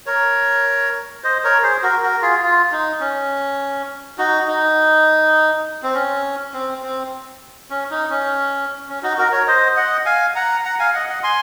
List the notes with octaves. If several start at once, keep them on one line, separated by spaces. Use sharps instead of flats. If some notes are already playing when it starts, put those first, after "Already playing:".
A#4 C#5
C5 D#5
A#4 C#5
G#4 C5
F#4 A#4
F#4 A#4
F4 G#4
F4
D#4
C#4
D#4 F#4
D#4
C4
C#4
C4
C4
C#4
D#4
C#4
C#4
D#4 F#4
F#4 A#4
A#4 C#5
C5 D#5
D#5 F#5
F5 G#5
F#5 A#5
F#5 A#5
F5 G#5
D#5 F#5
D#5 F#5
G#5 C6